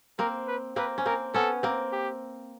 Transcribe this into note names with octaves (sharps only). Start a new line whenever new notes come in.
A#3 C4 A#4
B4
A#3 C4 B4
C#4
A#3 C4 A#4
B3 C#4 A4
A#3 C4
G4